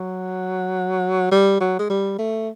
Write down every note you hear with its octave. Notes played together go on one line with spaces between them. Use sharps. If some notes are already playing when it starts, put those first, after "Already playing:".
Already playing: F#3
G3
F#3
G#3
G3
A3